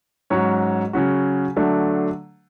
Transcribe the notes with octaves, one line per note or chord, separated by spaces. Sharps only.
G#2 F#3 C#4 F#4 C#5
C#3 F#3 C#4 F#4
D3 F#3 A3 D4